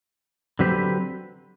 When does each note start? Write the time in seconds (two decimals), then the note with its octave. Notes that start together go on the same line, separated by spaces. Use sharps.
0.59 D3 F#3 C4 G4 B4